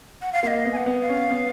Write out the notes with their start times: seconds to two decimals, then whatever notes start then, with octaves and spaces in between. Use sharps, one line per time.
0.22 F#5
0.33 F5
0.43 A#3 F5
0.47 D#5
0.65 B3
0.72 G#5
0.77 F#5
0.86 B3
1.01 F5
1.09 C#4
1.31 B3